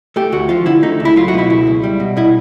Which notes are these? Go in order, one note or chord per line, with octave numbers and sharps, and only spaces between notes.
A3 G4
D2 F#4
F3 F4
D3 E4
A3 D#4
C#2
E4
F#3 F4
F#4
B2 E4
C#2 E4
C#2
G3
B2
B2 E4